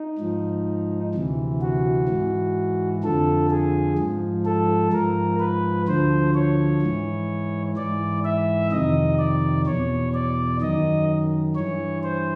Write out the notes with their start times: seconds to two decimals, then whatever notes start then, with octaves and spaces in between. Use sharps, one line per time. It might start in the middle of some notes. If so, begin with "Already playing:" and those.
Already playing: D#4
0.19 G#2 F3
1.14 D2 C3 E3
1.61 F#4
2.09 G#2 E3
3.04 F2 D3 F3 A4
3.50 G#4
3.98 G#2 F3
4.45 A4
4.93 G#2 F3 A#4
5.40 B4
5.88 D2 D3 F3 C5
6.35 C#5
6.82 G#2 E3
7.77 G#2 E3 D5
8.25 E5
8.72 F2 C3 D#3 D#5
9.19 D5
9.66 E2 B2 C#5
10.14 D5
10.61 F#2 D#3 D#5
11.56 G2 E3 C#5
12.03 C5